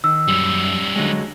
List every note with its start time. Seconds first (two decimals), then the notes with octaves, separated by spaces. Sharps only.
0.04 D#3 E6
0.28 F#2 G3 C#4
0.96 D3 F#3 G#3